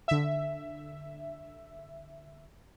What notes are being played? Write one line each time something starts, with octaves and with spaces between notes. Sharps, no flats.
D3 E5